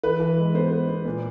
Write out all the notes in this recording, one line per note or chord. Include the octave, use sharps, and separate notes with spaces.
E3 B4
E3
G#3
B3 C5
B3
B3
A#2